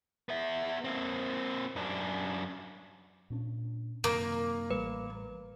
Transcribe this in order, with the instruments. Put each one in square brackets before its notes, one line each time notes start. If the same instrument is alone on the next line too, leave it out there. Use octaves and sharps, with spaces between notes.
[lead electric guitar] B3 E5
A#3 C4
F#2 D4
[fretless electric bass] A#2 C#4 D4
[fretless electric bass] F#2 C3 D#3 [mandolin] A#3
[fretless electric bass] A1 G3 [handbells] B4